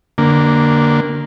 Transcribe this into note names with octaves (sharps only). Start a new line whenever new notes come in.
D3 A#3